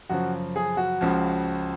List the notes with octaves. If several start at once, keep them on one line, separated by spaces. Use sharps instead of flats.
F#2 C#3 F3 F#4
G#4
F#4
C#2 C#3 F3